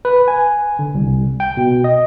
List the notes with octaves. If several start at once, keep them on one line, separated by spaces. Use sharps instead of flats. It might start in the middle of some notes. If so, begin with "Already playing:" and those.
B4
G#5
D3
C2
G5
B2
D#5